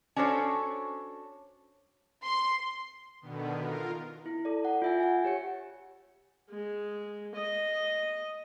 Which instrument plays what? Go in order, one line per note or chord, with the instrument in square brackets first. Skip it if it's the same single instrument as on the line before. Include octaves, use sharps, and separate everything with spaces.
[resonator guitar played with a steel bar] C#4 D4 F#4 A4 C5 C#5
[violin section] C6
[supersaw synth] B2 D3 D#3 B3
F4 A#4
[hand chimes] E4
A4 D5
F#5
F4 E5 G#5
F#5 G#5
G4 C#5 C#7
[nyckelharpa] G#3
D#5